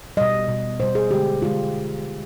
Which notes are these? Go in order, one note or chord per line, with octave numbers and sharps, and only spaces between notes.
B2 G3 D#5
B2 G3
B2 G3 C5
G#4
D3 G#3 G4
D3 G#3 F4